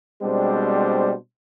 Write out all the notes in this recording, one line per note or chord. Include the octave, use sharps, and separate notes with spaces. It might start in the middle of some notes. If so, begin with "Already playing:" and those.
B2 G3 G#3 C4 D4 C5